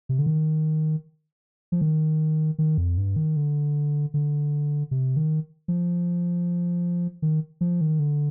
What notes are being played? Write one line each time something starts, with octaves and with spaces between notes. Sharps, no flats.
C3
D3
D#3
F3
D#3
D#3
F2
G2
D#3
D3
D3
C3
D#3
F3
D#3
F3
D#3
D3